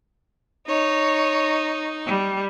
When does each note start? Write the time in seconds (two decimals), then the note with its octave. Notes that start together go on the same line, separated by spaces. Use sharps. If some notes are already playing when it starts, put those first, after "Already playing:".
0.68 D#4 C#5
2.07 G3